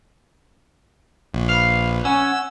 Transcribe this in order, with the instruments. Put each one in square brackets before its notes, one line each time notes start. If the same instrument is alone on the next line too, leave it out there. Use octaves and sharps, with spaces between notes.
[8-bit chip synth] A#1
[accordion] B4 [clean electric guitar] F5
[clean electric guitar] C#4 [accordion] F#5 G#5 [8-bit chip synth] E6